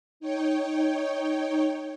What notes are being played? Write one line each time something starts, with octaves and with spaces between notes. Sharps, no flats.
D#4 C#5 G5